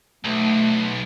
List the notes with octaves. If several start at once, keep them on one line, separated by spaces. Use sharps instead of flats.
B1 A3